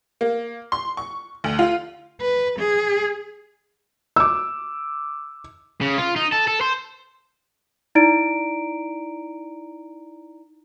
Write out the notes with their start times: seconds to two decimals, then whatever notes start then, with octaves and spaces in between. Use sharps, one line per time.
0.21 A#3
0.72 C6
0.97 C#6
1.44 D2
1.59 F4
2.22 B4
2.59 G#4
4.16 D6 E6
5.81 C#3
5.98 F4
6.16 D#4
6.32 A4
6.48 A4
6.61 C5
7.95 D#4 E4 D5 A#5 D7